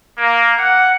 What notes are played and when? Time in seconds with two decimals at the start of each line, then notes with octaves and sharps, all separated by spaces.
0.18 A#3
0.59 F#5